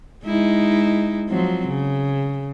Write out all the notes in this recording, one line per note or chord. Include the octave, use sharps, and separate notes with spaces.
G#3 D#4 E4
F3 F#3 C4
C#3